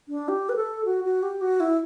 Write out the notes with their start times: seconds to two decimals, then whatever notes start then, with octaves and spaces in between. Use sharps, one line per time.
0.09 D4
0.28 G4
0.49 B4
0.56 A4
0.85 F#4
1.04 F#4
1.23 G4
1.41 F#4
1.60 E4